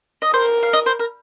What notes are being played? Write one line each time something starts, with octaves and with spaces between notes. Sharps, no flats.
D#5
A#4 C5
F5
D#5
C5
A#4